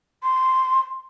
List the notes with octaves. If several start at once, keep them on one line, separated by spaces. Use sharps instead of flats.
C6